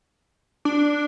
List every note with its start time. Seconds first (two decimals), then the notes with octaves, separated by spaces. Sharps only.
0.65 D4